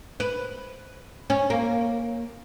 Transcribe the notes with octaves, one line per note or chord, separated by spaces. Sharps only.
B4
C#4
A#3